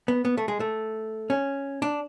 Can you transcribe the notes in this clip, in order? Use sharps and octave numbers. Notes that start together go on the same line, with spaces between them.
B3
B3
A3
G#3
A3
C#4
D4